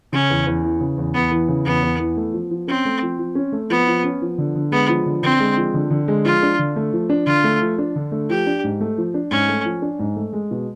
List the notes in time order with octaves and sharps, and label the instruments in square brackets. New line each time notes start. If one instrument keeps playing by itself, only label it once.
[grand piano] C#3 [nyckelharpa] C#4
[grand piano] E2
E2
E3
C#3
E2
[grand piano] E2 [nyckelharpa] B3
[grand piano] E3
C#3
[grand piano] E2 [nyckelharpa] B3
[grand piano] E2
E3
A3
F3
F3
[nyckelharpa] C4 [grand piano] C#4
[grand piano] A3
F3
F3
C#4
A3
[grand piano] F3 [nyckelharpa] B3
[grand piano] F3
C#4
F3
D3
D3
[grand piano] G#3 [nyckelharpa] B3
[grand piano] F3
D3
[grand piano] D3 [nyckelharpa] C4
[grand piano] G#3
F3
D3
D3
G#3
[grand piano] F3 [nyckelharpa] F4
[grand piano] D4
D3
A3
F3
D4
[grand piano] D3 [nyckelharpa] F4
[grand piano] A3
F3
D4
D3
A3
[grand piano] F3 [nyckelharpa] G4
[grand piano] D4
G#2
A3
F3
D4
[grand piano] G#2 [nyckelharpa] C#4
[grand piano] A3
F3
D4
G#2
A3
G#3
B2